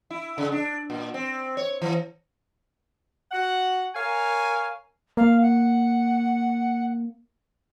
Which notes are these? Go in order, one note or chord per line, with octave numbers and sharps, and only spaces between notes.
E4
C#3
D4
A#2
C4
C#5
E3
F#4 F#5
A#4 C#5 F5 G#5
A#3 F5
F#5